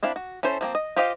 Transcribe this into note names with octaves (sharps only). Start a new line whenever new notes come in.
C4 D4 E4 F5
F#4
C#4 E4 A4 C5
F3 A#3 C4
D#5
F4 G4 C5 D#5 F5